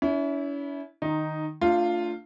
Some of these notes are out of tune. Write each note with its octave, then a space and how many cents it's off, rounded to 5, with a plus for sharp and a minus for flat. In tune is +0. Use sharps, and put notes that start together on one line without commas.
C#4 +35 E4 -15
D#3 -15 D#4 +0
A3 +35 D4 +0 F4 +0